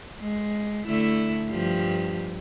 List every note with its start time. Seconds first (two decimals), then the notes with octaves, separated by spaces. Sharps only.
0.20 G#3
0.86 D3 A3 E4
1.50 G2 F3 G4